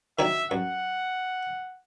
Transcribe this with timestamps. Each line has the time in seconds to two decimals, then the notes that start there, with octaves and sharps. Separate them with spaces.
0.19 D#3 F#3 D4 E5
0.51 F#2 F#5